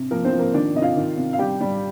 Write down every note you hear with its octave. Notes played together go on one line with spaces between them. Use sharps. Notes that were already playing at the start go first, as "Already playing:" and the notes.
Already playing: C3
F3 A#3 A#4
C4 C5
F3
A#3 A#4
D#3 D4 D5
C3 D#5
F4 F5
D#3
C3
F5
G3 G4 G5
G3